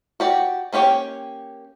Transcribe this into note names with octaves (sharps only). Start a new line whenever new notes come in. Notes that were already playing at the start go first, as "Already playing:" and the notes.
F#4 G4 D5
A#3 C#4 G4 C#5 G5